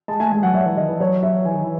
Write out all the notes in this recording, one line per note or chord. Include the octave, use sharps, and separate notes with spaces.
G#3 A5
A3 G#5
G#3 G#5
F#3 F#5
F#3 E5
E3
D#3 D#5
E3
F#3 C#5
E5
E3 G#5
D#3
E3